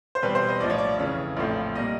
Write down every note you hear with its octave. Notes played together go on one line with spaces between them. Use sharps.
C5
E2 B2 G3 C4 B4
C5
D#5
A#1 A2 F3 D5
C#5
D5
F2 C#3 E3 C#5
A#1 A2 F3 A3 C4
A#2 G3 A#3 D#5